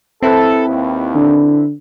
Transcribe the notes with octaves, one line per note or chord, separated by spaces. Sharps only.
C4 E4 A4 B4
D#2
D3